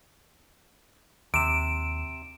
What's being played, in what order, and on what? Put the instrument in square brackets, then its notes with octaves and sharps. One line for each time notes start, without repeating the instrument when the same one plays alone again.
[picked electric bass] D#2 [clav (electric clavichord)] C3 [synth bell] D7 E7